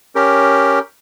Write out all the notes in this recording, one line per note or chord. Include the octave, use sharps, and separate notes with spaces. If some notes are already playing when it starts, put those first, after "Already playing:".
C#4 G4 A#4